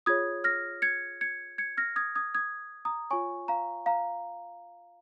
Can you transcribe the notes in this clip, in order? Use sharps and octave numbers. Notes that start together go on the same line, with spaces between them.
F4 G#4 C#5 D#6 G#6
F6 A#6
G#6 C#7
G#6 C#7
G#6 C#7
F6 A#6
D#6 G#6
D#6 G#6
D#6 G#6
A#5 D#6
F4 C#5 G#5 C#6
F5 A#5
F5 A#5